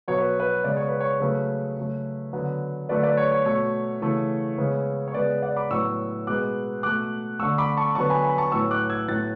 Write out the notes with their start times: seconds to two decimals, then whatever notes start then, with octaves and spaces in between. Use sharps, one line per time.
0.08 B2 F#3 B3 C#5
0.18 B4
0.40 B4
0.64 C#3 G#3 B3 D5
0.77 C#5
0.88 B4
1.00 C#5
1.20 C#3 F#3 A3 B4
1.77 C#3 F#3 A3
2.33 D3 F#3 B3
2.89 D3 F#3 A3 B4 D5
3.03 B4 D5
3.17 C#5
3.32 C#5
3.45 B2 A3 C#5
4.02 C#3 E3 A3
4.58 C#3 G#3 B3
5.08 C#5
5.14 C#3 G#3 B3 B4 D5
5.42 D5 F#5
5.56 B5 D6
5.70 A2 F#3 B3 C#6 E6
6.27 B2 G#3 B3 D6 F#6
6.83 B2 A3 D6 F#6
7.39 D3 A3 C#6 E6
7.58 B5 D6
7.77 A5 C#6
7.95 D3 F#3 B3 A5 C#6
8.10 G#5 B5
8.23 G#5 B5
8.38 A5 C#6
8.52 A2 F#3 B3 C#6 E6
8.71 D6 F#6
8.90 E6 G#6
9.08 A2 F#3 B3 F#6 A6